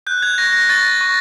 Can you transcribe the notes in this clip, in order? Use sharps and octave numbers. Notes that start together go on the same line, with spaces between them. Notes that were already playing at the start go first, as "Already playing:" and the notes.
F#6 G6
G#6
C#6 A#6
A#6
C#6 A6
C#6